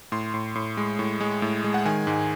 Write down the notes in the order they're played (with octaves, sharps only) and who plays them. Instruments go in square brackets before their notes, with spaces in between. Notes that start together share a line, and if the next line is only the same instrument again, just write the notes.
[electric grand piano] A2 C6
A2
A2
G#3
A2
G#3
A2
G#3
F#5
D#3 G#5
G#2